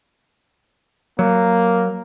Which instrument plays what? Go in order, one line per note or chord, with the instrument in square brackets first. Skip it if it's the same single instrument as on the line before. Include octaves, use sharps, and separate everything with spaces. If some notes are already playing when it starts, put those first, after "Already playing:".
[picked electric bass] F#3 [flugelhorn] A#3